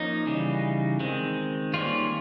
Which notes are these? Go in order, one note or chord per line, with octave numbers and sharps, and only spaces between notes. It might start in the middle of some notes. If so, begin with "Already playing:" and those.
Already playing: F3 A#3 C#4 D#4
C#3 E3 G3
D#3 G#3 C4
D#3 G3 A#3 C#4 F4